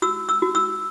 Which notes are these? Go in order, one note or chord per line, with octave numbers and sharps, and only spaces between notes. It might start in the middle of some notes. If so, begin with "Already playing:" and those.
F#4 E6
E6
F#4
E6